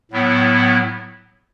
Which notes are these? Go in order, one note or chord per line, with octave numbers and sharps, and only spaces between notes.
A2 F#3 B3 E4